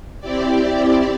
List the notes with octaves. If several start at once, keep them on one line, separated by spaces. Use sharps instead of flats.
C4 E4 G4 D5